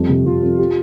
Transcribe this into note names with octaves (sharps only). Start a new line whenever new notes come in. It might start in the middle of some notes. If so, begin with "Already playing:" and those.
Already playing: F2 G3
C3
C3 F4
F2
G4